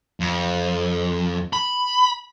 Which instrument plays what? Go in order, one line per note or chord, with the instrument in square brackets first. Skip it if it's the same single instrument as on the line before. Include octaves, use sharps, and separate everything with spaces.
[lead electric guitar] F2
B5